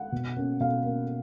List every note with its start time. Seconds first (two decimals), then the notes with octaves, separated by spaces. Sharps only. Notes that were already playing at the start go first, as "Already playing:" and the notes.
Already playing: F#5
0.12 B2
0.37 A#3 C#4
0.60 B2 F5
0.84 A#3 C#4